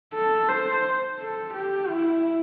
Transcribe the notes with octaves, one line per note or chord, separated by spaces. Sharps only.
A4
C5
A4
G4
E4